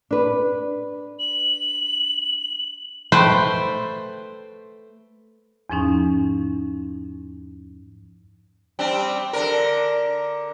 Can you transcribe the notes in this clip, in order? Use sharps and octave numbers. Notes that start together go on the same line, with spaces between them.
D4 B4
F#7
A3 B4 C5 G5
E2 G#2 F3 C#4 D#4
G3 C4 D4
D3 D4 A#4